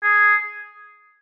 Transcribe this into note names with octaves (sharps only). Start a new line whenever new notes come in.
G#4